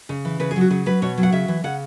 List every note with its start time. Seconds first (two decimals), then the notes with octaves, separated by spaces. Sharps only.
0.09 C#3
0.25 E3
0.40 C#3 B4
0.51 G#4
0.56 F#3
0.61 F#4
0.70 C#3 G#4
0.86 F#3 B4
1.02 B2 C#5
1.17 F#3
1.23 F#5
1.32 C#3 E5
1.48 E3
1.64 C#3 F#5